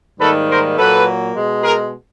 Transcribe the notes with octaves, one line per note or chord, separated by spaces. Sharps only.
G#2 D#3 G3 A#3 A4 B4
A#4 C5
A#2 F#3 A#3 A4 B4
B2 G#3
G#4 A#4